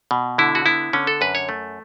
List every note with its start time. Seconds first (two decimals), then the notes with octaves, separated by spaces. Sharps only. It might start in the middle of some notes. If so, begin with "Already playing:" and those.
0.11 B2
0.38 D3 E4
0.55 F#4
0.66 B3 E4
0.93 D3 C#4
1.07 A4
1.21 F#2 B4
1.35 C#5
1.49 A3